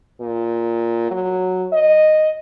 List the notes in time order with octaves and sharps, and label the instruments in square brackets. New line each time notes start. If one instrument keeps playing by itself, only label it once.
[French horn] A#2
F#3
D#5